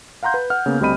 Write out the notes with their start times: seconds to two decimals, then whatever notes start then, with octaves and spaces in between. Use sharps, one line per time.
0.23 F5 F#5 A#5 C6 G6
0.34 B4
0.50 F#5 F6
0.66 C#3 A#3 B3
0.81 D2 G3 C4 D#5 B5 D#7